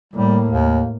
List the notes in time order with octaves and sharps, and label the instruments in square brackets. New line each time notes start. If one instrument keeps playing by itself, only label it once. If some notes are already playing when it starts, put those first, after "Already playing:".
[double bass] A2 A#3 [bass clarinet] G3
[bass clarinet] D#2